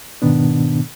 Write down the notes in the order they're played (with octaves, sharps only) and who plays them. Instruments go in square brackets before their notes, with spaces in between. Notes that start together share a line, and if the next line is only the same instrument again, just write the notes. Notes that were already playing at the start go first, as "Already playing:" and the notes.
[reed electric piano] G#2 B2 D#3 B3 D4